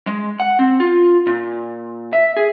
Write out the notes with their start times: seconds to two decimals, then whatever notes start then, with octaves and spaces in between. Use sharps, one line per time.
0.07 G#3
0.40 F#5
0.59 C4
0.80 F4
1.27 A#2
2.13 E5
2.37 G#4